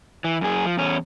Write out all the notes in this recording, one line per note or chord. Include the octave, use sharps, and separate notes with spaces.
E3
F#2 G#4
F3
E2 C#4